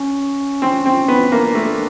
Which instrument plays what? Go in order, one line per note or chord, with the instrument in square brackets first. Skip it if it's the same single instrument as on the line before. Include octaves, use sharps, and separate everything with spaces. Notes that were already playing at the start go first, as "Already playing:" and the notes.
Already playing: [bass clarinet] C#4
[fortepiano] C4
C4
B3
[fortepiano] A#3 [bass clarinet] D4
[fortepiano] A3